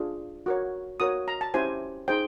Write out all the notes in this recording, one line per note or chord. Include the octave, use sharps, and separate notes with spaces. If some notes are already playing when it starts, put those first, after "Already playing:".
Already playing: D4 F4 G#4
F#4 A#4 C#5
F#4 A#4 C#5 D#6
A#5
A5
C#4 E4 G4 C5 G#5
D#4 G#4 C5 G5